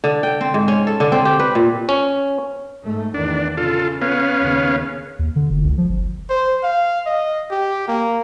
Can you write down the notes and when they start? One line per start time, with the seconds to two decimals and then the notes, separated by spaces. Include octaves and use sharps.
0.04 D3
0.23 G5
0.41 C4
0.54 G#2
0.68 C#4
0.87 A4
1.00 D3
1.12 C4
1.25 G4
1.39 B4
1.55 A#2
1.89 C#4
2.84 G#2 A3
3.14 E2 D#3 D4
3.57 C#3 F4 A4
4.02 B3 C#4 F5
4.41 D#2 C#3
5.19 D#2
5.36 D3
5.50 F#1
5.64 C#2
5.78 F3
5.89 G1
6.30 C5
6.64 F5
7.07 D#5
7.51 G4
7.88 A#3